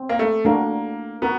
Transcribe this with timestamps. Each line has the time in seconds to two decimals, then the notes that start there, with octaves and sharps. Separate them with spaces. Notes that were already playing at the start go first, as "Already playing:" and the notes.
Already playing: C4
0.09 A#3
0.19 A3
0.45 A3 A#3 D4 F#4 A#4
1.22 B3 F#4 A#4